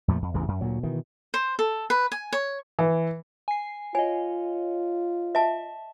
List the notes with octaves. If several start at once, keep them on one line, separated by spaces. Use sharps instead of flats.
F2 A#2 F3 A3
F2
A1 E2 G2 C#3
F#2
D2 A#2 F#3
B2 D#3 E3
C5
A4
B4
G#5
C#5
E3
G#5 C7
F4 C#5 D#5 G#5
D#5 E5 A5